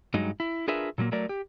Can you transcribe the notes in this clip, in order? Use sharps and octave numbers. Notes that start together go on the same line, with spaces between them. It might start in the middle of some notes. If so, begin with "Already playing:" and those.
G2 F#3 G#3 D#4
E4
D4 F4 G#4 A#4 B4 E5
A#2 F#3 G3 A#3
F#3 A3 A#4 D5
G4